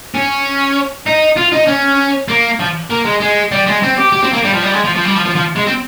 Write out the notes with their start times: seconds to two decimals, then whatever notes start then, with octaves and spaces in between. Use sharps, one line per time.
0.15 C#4
1.06 D#4
1.37 F4
1.53 D#4
1.68 C#4
2.28 A#3
2.60 F3
2.90 A#3
3.05 G#3
3.21 G#3
3.52 G3
3.67 G#3
3.82 C4
3.97 G4
4.12 G4
4.23 C4
4.33 A#3
4.44 G3
4.54 F3
4.64 G3
4.74 G#3
4.84 F3
4.95 F3
5.05 G3
5.15 F3
5.25 F3
5.36 F3
5.56 G#3
5.67 C4